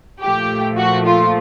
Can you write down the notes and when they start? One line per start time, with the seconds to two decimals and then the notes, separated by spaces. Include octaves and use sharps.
0.21 A#2 F3 A3 G4
0.77 F#4
1.06 F4